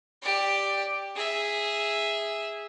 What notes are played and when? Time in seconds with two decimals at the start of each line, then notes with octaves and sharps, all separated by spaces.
0.22 G4 D5
1.15 G#4 E5